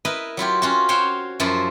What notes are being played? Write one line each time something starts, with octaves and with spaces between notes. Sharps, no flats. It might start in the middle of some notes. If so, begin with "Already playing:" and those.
E4 A#4 B4 D#5
F#3 E4 F4 G4
C#4 F4 F#4
F#4 C5 C#5 F5 G5
F#2 F3 E4 F4 A5